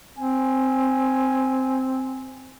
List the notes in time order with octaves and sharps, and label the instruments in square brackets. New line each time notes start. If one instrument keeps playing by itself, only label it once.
[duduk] C4 [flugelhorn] G#5